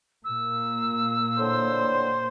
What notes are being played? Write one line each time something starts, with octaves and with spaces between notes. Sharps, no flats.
A#2 A#3 E6
A2 D3 C5